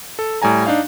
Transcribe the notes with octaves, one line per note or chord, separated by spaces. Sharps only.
A4
A2 G3 G#5 A#5
D4 D#4 F5